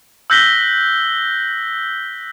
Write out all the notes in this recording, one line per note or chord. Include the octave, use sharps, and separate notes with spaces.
E6 F#6 G6 A#6 B6 G7